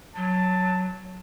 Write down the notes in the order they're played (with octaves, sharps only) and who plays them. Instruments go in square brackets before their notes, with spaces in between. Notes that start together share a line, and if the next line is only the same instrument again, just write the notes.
[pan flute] F#3 [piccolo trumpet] A5